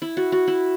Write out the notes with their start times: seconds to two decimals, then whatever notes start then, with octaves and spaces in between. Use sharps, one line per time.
0.02 E4
0.17 F#4
0.32 F#4
0.48 E4